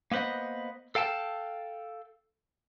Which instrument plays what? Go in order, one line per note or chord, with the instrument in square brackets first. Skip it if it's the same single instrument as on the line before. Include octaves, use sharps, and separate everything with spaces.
[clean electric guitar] A#3 B3 B4 C5 D#5
A4 F5 G5 A5